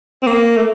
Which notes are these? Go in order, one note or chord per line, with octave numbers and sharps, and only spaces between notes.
C4
A#3
A3